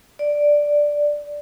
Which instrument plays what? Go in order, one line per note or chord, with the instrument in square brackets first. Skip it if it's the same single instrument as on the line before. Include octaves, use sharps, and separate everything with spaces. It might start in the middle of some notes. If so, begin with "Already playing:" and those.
[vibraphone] D5